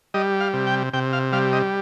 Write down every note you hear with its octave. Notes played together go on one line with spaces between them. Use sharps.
G3 D#5
F5
C3
G5
C3 G5
F5
G3 F5
D#5